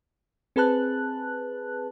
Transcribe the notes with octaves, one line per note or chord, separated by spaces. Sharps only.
C4 G#4 B4 A5 F#6